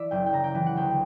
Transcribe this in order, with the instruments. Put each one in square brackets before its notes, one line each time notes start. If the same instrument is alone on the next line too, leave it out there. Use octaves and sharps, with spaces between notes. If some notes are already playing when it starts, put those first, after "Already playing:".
Already playing: [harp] E3 D5 E5
F#1 G5
G5
C#3 A#5
G5
E3
F#5
D2 G5